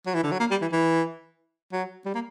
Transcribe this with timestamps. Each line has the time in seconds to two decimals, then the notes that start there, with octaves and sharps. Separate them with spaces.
0.06 F#3
0.15 E3
0.23 D3
0.32 F#3
0.40 A#3
0.51 G3
0.62 E3
0.72 E3
1.73 F#3
2.06 G3
2.14 A#3